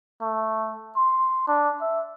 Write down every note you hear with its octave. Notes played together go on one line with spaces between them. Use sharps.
A3
C6
D4
E5